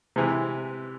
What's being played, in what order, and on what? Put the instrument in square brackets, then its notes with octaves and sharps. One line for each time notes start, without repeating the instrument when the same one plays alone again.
[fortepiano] C3 E3 G#3